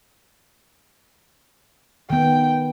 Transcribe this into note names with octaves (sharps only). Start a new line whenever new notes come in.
D#3 B3 G5